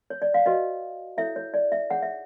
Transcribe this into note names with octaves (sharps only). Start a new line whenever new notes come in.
C#5
D5
F5
F#4 B4 D#5
E4 A4 C#5 E5
C#5
D5
E5
D#4 G#4 C#5 F#5
E5